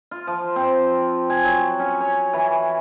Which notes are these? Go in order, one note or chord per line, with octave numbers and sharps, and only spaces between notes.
F4
F3
C4
G#5
F#3
C#4
C#5
E3